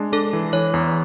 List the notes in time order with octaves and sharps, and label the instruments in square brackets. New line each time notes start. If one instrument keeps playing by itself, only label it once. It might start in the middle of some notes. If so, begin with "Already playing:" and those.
Already playing: [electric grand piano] G#3 D4
[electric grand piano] D4 [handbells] A4
[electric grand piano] E3
[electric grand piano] E3 [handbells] C#5
[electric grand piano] E2